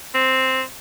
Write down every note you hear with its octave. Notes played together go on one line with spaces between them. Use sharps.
C4